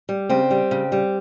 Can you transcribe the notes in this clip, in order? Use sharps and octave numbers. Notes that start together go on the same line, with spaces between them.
G3
C#3 C4
G3
C#3
G3